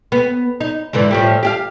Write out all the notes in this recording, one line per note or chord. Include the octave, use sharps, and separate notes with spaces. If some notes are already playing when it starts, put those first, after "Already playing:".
B3
D#4
G#2 D3 E3
A2 F3 G3
G4 G#4 F5